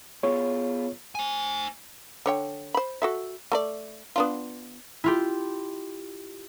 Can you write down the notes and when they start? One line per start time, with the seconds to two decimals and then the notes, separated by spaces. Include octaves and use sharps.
0.23 B3 F4 G#4 C#5
1.15 C5 G#5
2.26 D3 C#5 G5
2.74 C5 B5
3.02 F#4 A4 E5
3.52 A3 A#4 D5
4.16 B3 D4 F4
5.04 E4 F4 G4